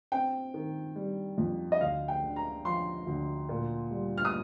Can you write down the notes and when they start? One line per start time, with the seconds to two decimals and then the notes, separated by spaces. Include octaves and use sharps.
0.12 C4 G5
0.54 D#3
0.96 G3
1.38 F2
1.72 D#5
1.80 D2 F5
2.08 G5
2.22 D3
2.36 A#5
2.65 F3 C6
3.06 D2
3.49 A#2
3.91 G3
4.18 F6
4.25 D#6